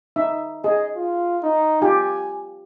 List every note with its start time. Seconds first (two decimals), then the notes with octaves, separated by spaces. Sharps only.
0.16 D#4 E5
0.64 G#4 D#5
0.96 F4
1.43 D#4
1.82 F4 G4 G#5